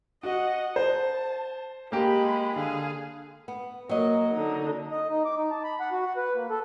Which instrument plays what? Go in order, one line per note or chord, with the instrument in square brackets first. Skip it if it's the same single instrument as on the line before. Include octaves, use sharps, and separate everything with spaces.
[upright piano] F#4 [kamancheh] D#5 F#5
[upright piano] C5 [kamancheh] A5
[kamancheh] G#3 B5 [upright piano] A#3 G4
[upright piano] D3 [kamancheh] G#4 F5
[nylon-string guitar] B3
[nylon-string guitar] F#3 D#5 [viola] A#3 A#4
[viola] D3 D#4
[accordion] D#5
D#4
D6
D#4
A5
B5
F#5
F#4
F#5
B4
A#3
A4